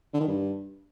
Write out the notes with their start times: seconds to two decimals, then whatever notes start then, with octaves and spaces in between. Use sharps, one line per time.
0.14 D3
0.20 D#3
0.27 G2